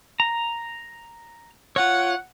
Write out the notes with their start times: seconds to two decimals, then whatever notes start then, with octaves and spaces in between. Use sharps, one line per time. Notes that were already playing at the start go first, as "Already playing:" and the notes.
0.20 A#5
1.76 F4 C#5 F#5